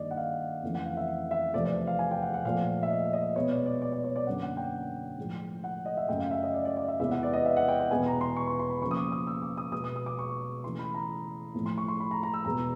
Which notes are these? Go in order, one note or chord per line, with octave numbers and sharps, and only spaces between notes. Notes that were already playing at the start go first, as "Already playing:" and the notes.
Already playing: G2 D#3 G3 A#3 D5 D#5
F#5
F5
F2 C#3 E3 A3
F#5
F5
E5
E5
E2 C3 F3 A3 D5
D5
F5
G#5
G5
F#5
F#5
A#2 F3 A3 F5
E5
D#5
D#5
B2 G#3 B3 C#5
D5
D5
D5
D5
C#5
D5
F#2 D3 F#3 A#3 F#5
F#5
G5
A2 F3 G#3
F#5
D#5
E5
F#2 C#3 F#3 A3 G5
F5
E5
D#5
D5
D5
D5
E5
E2 C3 E3 G#3 B3 E5
F#5
D5
D#5
E5
F#5
G5
G5
E2 B2 G#3 B3 G#5
A#5
C6
C#6
C6
C6
B5
C#3 F3 A#3 C#6
D#6
D6
D#6
E6
D6
D#6
B2 G#3 B3 D#6
D#6
D#6
D6
C#6
C#3 E3 A3 C6
B5
A#5
A2 F3 A3
C6
C#6
C6
B5
A#5
A#5
E6
E2 B2 G#3 A#5